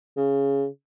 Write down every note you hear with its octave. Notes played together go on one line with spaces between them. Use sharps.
C#3